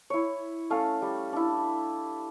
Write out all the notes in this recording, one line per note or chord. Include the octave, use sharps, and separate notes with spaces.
E4 C#5
A3 C#4 F5
G3
D4 E4